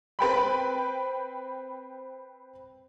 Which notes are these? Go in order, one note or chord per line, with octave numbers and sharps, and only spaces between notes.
C4 B4 G5 B5